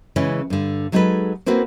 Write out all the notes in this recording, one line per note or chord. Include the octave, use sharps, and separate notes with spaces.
C#3 E3 G#3 C#4 E4
G2 D3
F#3 G#3 D#4 G#4 A4 B4
A#3 C4 E4 F#4 B4